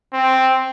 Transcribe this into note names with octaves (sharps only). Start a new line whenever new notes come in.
C4